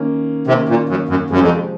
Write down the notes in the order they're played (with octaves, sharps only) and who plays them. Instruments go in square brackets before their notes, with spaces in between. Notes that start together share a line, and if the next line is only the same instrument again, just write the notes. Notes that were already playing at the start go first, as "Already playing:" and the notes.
Already playing: [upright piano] D#3 A#3 C#4
[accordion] C3 [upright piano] D#3 A#3 C#4
[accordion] A#2
F#2
F#2
[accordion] F#2 [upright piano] C3 F3 G#3
[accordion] F2